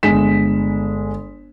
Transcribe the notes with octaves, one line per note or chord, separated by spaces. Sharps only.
G1 G#3 B6 E7